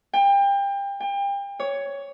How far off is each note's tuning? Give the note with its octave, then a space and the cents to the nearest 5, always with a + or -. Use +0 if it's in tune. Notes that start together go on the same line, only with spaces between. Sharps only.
G5 +30
G5 +35
C#5 +10